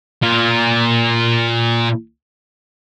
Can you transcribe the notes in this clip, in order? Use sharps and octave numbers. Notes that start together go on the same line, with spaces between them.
A#2 F4